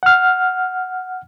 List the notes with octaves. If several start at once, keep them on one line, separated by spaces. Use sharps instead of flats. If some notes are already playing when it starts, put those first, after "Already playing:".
F#5 F6